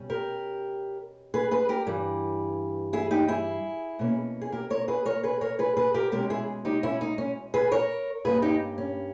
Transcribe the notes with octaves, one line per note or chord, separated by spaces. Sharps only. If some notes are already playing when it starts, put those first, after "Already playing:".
Already playing: B2 G3 C#4
G4 A#4
G#4 B4
G#4 B4
G4 A#4
G2 E3 G3
E4 G#4
D#4 G4
E4 G#4
B2 A#3 C#4
G#4
G4 A#4
A#4 C#5
G#4 B4
A#4 C#5
G#4 B4
A#4 C#5
G#4 B4
G#4 B4
G4 A#4
B2 G#3 C#4 G4 A#4
E4 G#4
D#4 G4
C#4 E4
D#4
C#4
G#4 B4
A#4 C#5
G2 G3 A#3 C#4 G#4 B4
D#4 G4
C#4